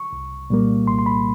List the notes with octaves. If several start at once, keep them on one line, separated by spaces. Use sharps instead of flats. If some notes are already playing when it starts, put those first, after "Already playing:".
Already playing: C#6
C2
A#2 G3 A#3
C2 C6
C6
B5